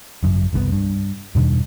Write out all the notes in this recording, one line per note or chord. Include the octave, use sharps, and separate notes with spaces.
G#1 F#2 C#3
F#1 C2 C3 B3
G2
E2 G2 B2 D#3